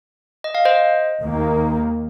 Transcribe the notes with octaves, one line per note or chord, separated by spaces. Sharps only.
D#5
F5
C5 D#5
D#2 D#3 A#3